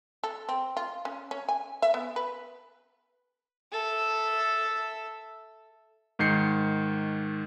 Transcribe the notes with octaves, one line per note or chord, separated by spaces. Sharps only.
A4
C4
F4
C#4
C#4
G#5
E5
B3
B4
A4 E5
G#2 D#3 G6 C7 C#7